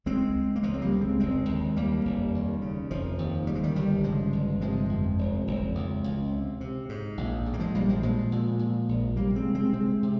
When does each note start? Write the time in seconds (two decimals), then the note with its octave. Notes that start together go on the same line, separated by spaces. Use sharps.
0.06 C#2 G#3 C4
0.35 C#2
0.56 A#3
0.63 C#2 F3 G#3
0.74 C4
0.81 G3 A#3
0.92 C#3
1.01 G#3 C4
1.20 F1 G#3 C4
1.49 D#2
1.76 D#2 G3 A#3
2.05 F1
2.34 D#2
2.62 C#3
2.91 F1 F3
3.19 D#2
3.47 C#3 G3
3.55 G#3
3.63 D#3 G3
3.76 G1 D#3 G3
4.04 C#3 F3 G#3
4.33 G1
4.61 C3 F3 G#3
4.89 F2
5.18 F1
5.47 F1
5.75 C#2
6.04 C#2
6.32 C3
6.61 C3
6.89 G#2
7.17 A#1
7.46 G#2
7.54 A#3
7.60 F3 G#3
7.74 A#1 G3 A#3
7.89 F3 G#3
8.03 A#2 F3 G#3
8.32 A#2
8.59 A#2
8.89 A#1
9.16 C3 G3 A#3
9.35 G#3 C4
9.45 C3
9.55 G#3 C4
9.73 C3 G#3 C4
10.03 C3